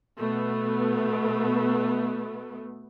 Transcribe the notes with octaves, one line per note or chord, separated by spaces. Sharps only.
B2 A3 B3